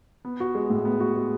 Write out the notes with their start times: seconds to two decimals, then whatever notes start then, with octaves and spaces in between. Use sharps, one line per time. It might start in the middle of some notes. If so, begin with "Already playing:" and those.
0.25 B3
0.40 F#4
0.55 G#3
0.70 A2
0.85 B3
1.00 F#4
1.16 G#3